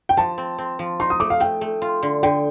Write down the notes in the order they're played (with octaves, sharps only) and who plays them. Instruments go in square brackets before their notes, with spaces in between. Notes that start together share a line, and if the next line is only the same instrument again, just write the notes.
[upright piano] G5
[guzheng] F3 [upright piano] A5
[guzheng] C4
C4
F3
[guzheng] D#4 [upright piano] C6
[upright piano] D#6
[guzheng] A3 [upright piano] D6
[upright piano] F5
[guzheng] A3 [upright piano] G5
[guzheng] A3
F4
D3
[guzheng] D3 [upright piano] G5